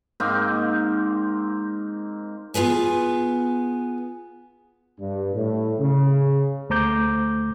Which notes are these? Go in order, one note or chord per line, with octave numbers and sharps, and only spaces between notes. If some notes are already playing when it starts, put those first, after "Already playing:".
G#2 A#3 C4 D#4
B3 F4 G#4 B4 G#5
G2
A2
C#3
D2 A3 C5 A#5 D6 G6